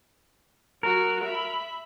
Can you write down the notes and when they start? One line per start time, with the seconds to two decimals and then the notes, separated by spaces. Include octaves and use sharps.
0.83 F#3 F#4 A#4
1.24 E5 B5